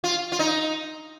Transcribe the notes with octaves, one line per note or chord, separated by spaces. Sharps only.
F4
F4
D#4